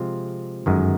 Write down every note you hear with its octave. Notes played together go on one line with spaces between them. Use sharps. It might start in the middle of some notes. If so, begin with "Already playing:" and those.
Already playing: C3 F3 G#3 C4 F4
G1 F#2 D#3 G#3